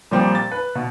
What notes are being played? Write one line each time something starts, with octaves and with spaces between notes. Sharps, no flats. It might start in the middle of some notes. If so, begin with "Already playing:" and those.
A#2 F3 G3 C4
A6
B4
B2